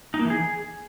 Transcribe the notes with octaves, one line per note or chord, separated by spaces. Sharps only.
D#4
A#3
E3
G#4